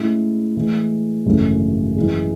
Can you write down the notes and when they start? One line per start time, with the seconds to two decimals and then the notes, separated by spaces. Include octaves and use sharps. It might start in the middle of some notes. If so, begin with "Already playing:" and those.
Already playing: A2 G#3 C#4 E4 G#4
0.56 A2 E3 G#3
1.26 G#1 F#2 C#3 E3 A3
1.96 F#2 E3 G#3